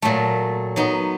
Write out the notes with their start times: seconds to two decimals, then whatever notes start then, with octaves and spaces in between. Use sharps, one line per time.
0.02 A#2 F#3 A3
0.76 F#3 B3 D#4